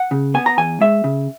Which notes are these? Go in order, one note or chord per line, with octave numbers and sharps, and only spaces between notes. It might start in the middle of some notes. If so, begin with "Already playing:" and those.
Already playing: F#5
C#3
B3 G#5
A#5
E2 G#5
G#3 E5
C#3